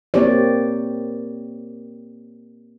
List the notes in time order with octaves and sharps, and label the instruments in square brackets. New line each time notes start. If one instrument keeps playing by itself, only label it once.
[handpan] A#3 C4 G4 C#5 D5